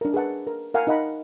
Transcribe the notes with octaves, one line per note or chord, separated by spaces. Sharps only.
D4 A#4
G#4 B4 F#5 A5
A#4
A#4 F5 F#5 G#5
D#4 A#4 D#5 F#5 B5